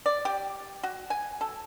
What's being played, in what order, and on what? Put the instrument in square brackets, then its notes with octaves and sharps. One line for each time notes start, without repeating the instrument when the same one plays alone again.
[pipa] D5
G4
F#4
G#5
A4